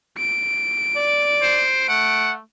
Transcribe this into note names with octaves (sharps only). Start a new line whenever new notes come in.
D7
D5
C5
A3 F#5